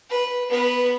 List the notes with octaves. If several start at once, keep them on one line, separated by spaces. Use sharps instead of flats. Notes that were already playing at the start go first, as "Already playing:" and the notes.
B4
B3 B4